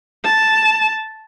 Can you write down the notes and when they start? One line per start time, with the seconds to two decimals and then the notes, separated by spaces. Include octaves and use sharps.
0.24 A5